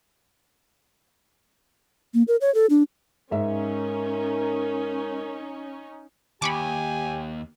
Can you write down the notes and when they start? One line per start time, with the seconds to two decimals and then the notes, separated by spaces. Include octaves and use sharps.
2.14 A#3
2.28 A#4
2.41 C#5
2.55 A4
2.70 D4
3.31 G#2 C#4 D#4 A#4 E5
6.42 D#2 G4 G#5 B5 C#6 D6